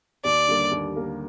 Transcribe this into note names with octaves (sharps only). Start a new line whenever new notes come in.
D#2 D5
D3 G3 A#3
D#2
D3 G3 A#3